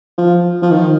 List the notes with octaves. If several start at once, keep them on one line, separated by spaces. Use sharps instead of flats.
F3
F3
D#3